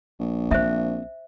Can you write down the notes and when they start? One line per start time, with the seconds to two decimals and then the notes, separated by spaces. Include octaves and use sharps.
0.20 A#1
0.51 C4 C5 E5